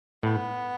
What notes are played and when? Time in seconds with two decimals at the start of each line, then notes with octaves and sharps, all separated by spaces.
0.23 A2 B3